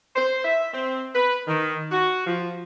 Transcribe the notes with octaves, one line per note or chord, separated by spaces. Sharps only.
C5
E5
C4
B4
D#3
F#4
F3